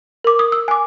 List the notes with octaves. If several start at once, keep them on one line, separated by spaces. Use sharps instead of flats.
A#4 D6
D#6
E6
G#5 D6